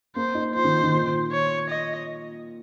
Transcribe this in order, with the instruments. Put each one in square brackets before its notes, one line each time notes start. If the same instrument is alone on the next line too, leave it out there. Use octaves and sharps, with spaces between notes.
[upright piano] A#3 [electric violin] C5
[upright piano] D#4
[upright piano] F3 [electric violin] C5
[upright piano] D#3
D#3
A#2
[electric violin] C#5
D#5